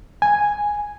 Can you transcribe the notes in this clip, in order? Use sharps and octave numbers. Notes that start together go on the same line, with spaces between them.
G#5